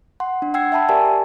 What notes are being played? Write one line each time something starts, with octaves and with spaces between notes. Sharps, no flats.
F#5 C6
D4
F#5 G5 E6 G#6 C7
E5 G5 A5 B5 E6
G4 A#4 D5 E5 G#5 A5
E5